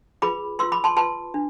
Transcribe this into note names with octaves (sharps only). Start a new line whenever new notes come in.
F4 G#4 B4 B5 D6
F4 B4 C6 E6
B5 D6
A5 C6
F4 B4 A5 C6
D4